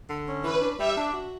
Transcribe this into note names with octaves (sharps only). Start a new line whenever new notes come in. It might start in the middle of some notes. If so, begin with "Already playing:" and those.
D3
C#4
E3 B4
D4
G3 E5
D4
F#4